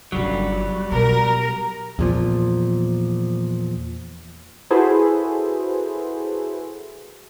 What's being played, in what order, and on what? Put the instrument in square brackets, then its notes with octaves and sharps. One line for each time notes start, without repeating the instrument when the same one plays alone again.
[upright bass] G1 C#3 [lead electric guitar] F#3 G3
[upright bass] B2 [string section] A#4
[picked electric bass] E2 A#2 F3
[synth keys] E4 F#4 G#4 A4 B4 C5